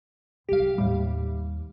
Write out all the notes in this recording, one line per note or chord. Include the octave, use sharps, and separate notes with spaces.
C2 F#3 G4 F5
D#2 A2 G3